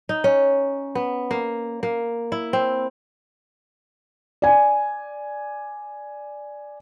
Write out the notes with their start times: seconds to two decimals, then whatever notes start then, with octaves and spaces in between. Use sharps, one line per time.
0.09 D#4
0.24 C#4
0.95 B3
1.31 A#3
1.83 A#3
2.32 E4
2.53 C4
4.42 D5 G#5